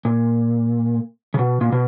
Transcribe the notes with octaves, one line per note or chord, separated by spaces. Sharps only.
A#2
C#3
B2
A#2
B2